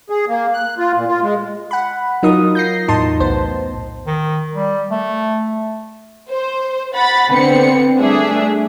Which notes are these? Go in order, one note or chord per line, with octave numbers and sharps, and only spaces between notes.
G#4
A#3
F#6
F4
A#2
F4
G#3
F#5 B5
F#3 D#4 F4 A#4 D#6
G6 A#6 C7
E2 A2 D#4 A5 C6
B1 B3 C5
D#3
G3
A3
C5
F#5 B5 A6
D3 B3 C4 C#7
G3 A3 D4 G#4 E5